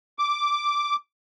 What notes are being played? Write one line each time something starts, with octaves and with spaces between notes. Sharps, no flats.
D6